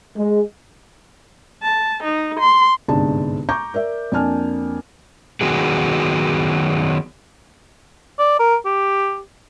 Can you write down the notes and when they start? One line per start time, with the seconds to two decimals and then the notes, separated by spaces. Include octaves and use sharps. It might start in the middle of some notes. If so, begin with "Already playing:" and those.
0.17 G#3
1.63 A5
2.03 D#4
2.40 C6
2.88 G1 C2 G#2 D4 A5
3.49 A#5 C#6 D6 G6
3.74 A#4 D5 E5
4.12 F2 A#3 D4 G#5 A5 F6
5.41 D#3 F#3 B3 F#4 G#4
8.19 D5
8.39 A#4
8.66 G4